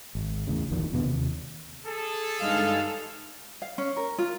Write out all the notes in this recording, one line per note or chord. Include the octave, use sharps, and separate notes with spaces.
G#1
E2 A2 C#3
A1 F2 A#2 D#3
E2 B2 D3 B3
D#2 C3
G#4 A4
G2 G#3 D#4 F5
F5
C#4
A#4
F4